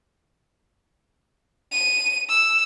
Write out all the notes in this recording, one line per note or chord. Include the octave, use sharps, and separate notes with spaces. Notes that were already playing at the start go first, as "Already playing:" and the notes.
D#7
E6